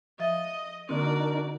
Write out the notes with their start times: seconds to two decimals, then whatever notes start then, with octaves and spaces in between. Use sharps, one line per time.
0.20 F3 D#5 E5 A6
0.89 D3 A#3 C4 D4 D#4 F#4 A#4 D5